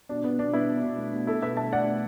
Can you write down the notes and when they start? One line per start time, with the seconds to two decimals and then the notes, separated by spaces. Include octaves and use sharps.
0.09 B2 D4
0.24 B2 B3
0.39 B2 D4
0.53 B2 B3 E4
0.69 B2
0.83 B2
0.98 A3
1.13 B2
1.27 B2 E4 A4
1.42 B2 B4 E5
1.57 A3 E5 A5
1.72 A3 D5 F#5
1.86 B2